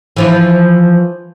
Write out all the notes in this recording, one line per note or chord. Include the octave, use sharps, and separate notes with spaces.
E3 F3 E4